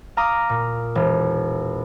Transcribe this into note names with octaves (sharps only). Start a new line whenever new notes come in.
F5 A#5 D6 D#6
A#2
E1